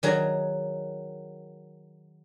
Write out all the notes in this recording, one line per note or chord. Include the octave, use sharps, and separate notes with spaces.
D#3 F#3 G#4